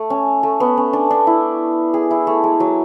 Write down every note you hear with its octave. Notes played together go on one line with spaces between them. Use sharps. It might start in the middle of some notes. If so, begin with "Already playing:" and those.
Already playing: A3
C#4
A3
B3
C#4
D4
D4
E4
G#4
E4
A3
G#3
F#3